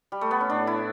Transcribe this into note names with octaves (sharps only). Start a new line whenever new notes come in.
G3
A3
B3
C#4
A2 D4
E4